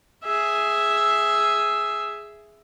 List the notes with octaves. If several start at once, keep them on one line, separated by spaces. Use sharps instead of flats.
G#4 E5